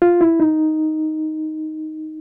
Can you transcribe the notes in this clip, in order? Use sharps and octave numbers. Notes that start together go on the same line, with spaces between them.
F4
E4
D#4